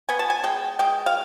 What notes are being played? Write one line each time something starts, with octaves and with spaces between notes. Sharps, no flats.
B3 G#5
A5
G#5
G#3 G5
G#3 G5
F5